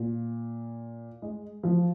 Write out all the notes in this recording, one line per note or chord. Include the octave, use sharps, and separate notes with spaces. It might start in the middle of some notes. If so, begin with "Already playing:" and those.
Already playing: A#2
G#3
F3